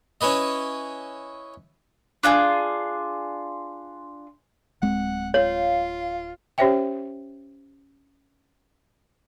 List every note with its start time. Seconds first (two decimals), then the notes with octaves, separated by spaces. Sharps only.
0.21 C#4 E4 B4 D#5
2.23 D4 F4 G#4
4.82 D1 G#3 C4 F#5
5.34 F4 C#5 F5
6.58 C#4 G4 C5 C#5 E5 G5